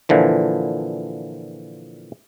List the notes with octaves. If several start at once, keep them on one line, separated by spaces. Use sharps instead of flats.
A#2 D3 E3 F3